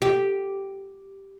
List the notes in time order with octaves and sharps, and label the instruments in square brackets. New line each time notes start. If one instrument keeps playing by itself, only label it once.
[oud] G4